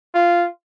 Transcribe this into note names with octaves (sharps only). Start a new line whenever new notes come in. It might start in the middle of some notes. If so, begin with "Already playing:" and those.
F4